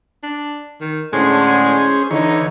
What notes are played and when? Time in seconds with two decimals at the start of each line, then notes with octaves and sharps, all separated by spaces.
0.23 D4
0.80 D#3
1.13 A2 D3 G#3 C#4 G#4 C5
2.11 D3 E3 D#4 C#5